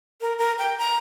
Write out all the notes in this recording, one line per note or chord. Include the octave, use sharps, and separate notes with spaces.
A#4
A#4
G5
A#5